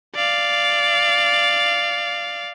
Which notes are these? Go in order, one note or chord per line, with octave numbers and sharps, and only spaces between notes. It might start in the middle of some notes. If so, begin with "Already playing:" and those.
D5 F5